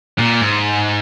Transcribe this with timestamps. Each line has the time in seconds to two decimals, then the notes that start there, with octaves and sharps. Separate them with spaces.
0.19 A#2
0.41 G#2